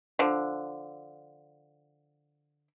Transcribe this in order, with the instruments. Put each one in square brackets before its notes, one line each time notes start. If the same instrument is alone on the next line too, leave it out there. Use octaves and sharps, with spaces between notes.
[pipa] D3 F3